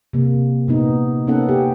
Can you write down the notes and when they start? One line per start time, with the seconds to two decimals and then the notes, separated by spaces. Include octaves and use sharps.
0.13 C3 A#3
0.68 A#2 B3 D#4
1.27 A#3 B3 C#4 D#4 A4 F#5
1.49 G4